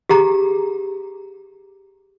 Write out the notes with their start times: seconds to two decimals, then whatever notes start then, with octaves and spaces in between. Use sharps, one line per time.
0.09 G4 G#4 A#5